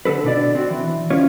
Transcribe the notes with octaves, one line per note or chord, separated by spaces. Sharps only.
D3 B3 A4 B4
B2 D4 D5
C4 F#4
E3
D2 C#4 F4 C#5